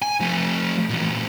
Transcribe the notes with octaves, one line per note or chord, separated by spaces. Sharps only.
G#5
F3 A3
A#2 E3